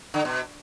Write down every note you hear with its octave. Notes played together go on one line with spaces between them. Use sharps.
D3
B2